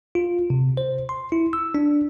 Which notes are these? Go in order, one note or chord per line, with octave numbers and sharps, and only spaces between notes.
F4
C3
C5
C6
E4
E6
D4